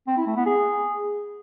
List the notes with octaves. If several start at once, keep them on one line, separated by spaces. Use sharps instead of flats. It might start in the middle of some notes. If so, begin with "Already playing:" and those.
C4
E4
A3
B3
G#4